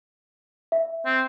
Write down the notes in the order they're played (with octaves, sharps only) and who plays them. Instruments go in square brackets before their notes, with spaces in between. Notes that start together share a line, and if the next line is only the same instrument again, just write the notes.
[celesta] E5
[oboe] C4